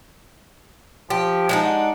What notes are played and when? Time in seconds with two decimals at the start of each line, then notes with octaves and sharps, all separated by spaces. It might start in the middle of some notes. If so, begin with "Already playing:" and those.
1.10 F3 G4
1.49 G#3 D4 D#4
1.65 F#5